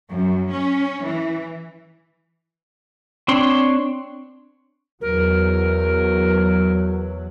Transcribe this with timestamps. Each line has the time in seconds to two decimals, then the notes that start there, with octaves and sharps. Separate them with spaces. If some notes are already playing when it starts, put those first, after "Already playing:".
0.12 F#2
0.51 C#4
1.06 E3
3.28 C4 D4 C#5 C6
5.01 E2 F#3 A#4